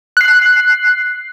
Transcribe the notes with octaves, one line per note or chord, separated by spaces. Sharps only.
F#6 C7